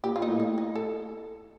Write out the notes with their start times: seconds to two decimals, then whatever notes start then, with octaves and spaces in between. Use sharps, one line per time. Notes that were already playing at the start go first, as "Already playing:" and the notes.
0.04 A#2 G4
0.16 F4
0.22 D#4
0.28 A2
0.40 D#4
0.58 D#4
0.75 A4